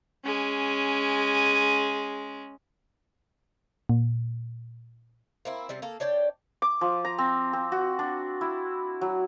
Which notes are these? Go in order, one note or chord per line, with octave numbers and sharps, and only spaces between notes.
G#3 C#4
A#2
A#3 C4 E4
C3 G3 C4
A#3 A4
D4 C#5 D5 G5
D6
F3
A#5
C4
C4
F#4
D4
E4
F#3